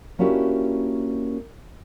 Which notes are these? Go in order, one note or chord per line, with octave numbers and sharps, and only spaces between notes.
A#3 C#4 D4 E4 F#4 G4